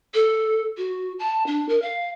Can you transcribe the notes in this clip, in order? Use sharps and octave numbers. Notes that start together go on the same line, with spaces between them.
A4
F#4
A5
D4
A#4
F5